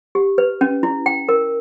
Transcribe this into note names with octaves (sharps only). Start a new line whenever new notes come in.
G4
B4
C#4
E4
G5
A#4